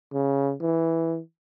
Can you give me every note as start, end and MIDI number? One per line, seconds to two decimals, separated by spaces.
0.13 0.53 49
0.61 1.20 52